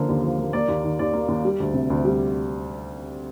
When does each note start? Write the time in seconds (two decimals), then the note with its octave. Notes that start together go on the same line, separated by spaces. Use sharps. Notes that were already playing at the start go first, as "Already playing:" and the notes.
Already playing: D3 F3 A#3
0.09 D#2
0.24 F3
0.38 A#3
0.53 A#3 D5
0.68 D#2
0.84 D#3
0.99 D#2 D5
1.13 A#3
1.28 D#2
1.45 G3
1.60 D2
1.74 C3
1.90 D2
2.04 G3